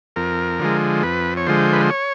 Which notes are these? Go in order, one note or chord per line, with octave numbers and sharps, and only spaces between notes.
F2 A#4
D3 F3 G#3
F2 B4
C#5
D3 F3 G#3 C5
B4
C5
C#5